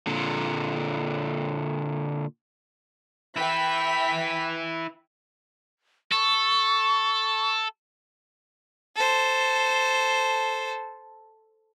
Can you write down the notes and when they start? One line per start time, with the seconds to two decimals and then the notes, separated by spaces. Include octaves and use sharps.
0.07 A#2 D3
3.36 E4 B4 E5 G5 B6
6.11 A4 C#6
8.95 A4 C5